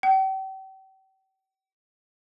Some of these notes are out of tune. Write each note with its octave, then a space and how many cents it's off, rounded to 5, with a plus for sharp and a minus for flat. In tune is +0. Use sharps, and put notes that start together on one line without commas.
G5 -40